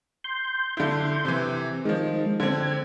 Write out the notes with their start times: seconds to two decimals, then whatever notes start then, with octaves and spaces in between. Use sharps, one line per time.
0.24 C6 G6
0.77 D3 E4
1.25 C3 E3
1.85 D#3 F3 G#3 D#4
2.40 D3 C4 G#6